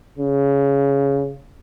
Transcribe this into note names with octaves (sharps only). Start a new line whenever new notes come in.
C#3